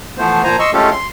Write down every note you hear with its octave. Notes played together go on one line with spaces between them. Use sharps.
E3 F3 A3 B3 C5
A#2 F3 C5 G#5 A#5
D#5 C6 C#6 E6
G#3 A3 C#4 F4 G4 A4
C6